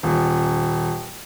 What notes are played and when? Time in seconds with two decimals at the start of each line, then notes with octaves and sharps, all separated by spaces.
0.03 D#1